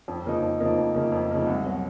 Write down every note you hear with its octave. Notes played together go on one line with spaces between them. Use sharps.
F2
C#3 F3 A#3 D#4
F2
C#3 F3 A#3 D#4
F2
C#3 F3 A#3 D#4
F2
C#3 F3 A#3 D#4
C2
B2 F#3